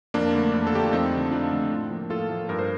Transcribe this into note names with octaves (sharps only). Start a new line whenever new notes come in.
F2 A#3 D4
D3 A3
F2
A4
D3 A3 G4
F4
F2 C4 D#4
D3 A3
F2 D4 F4
D3 A3
A2
F3 A#3
A2 F4 A4
F3 A#3
G2 A#4
C5